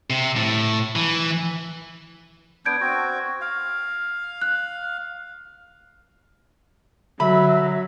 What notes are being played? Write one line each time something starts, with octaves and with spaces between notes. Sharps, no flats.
C3
A2
E3
B3 D4 G6 G#6 D7
C4 F#4
F5
F#6
D3 F#3 E5 B5